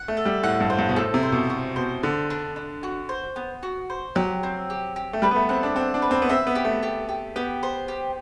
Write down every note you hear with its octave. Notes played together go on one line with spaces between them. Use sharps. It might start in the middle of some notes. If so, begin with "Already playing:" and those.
Already playing: F#5
A3
A4
G3
A2 F#5
G2
C5
G2
B2
A2 A4
C3
C5
B2
F#4
B2 C5
D3 D4
D4
D4
F#4
C5
B3
F#4
C5
F#3 G4
C4
G4
G4
A3
G3 B4
B3
A3
C4 F#5
D4
C4 F#5
D4
B4
C4
B3
C4 E5
B3
G4
A3
G4
G4
B3 G4
C5
G4